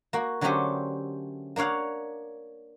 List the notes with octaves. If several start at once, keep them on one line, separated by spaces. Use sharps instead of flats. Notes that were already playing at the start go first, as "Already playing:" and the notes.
A#3 F#4
D3 F#3 A3 C#4 G4 C5
A#3 D4 C#5 F5 F#5